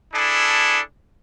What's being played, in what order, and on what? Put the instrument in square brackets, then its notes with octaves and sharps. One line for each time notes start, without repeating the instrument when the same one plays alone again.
[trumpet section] D4 E4 G#4 A4